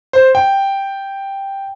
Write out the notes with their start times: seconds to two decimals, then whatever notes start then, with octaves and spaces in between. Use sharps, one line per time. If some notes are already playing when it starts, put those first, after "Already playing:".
0.13 C5
0.35 G5